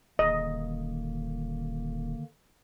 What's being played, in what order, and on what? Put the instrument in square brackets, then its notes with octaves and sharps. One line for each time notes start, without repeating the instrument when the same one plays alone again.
[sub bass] D#1 [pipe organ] D3 D#3 A#3 [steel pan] D#5